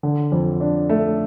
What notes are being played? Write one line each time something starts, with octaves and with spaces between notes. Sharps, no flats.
D3
F2
D4
A3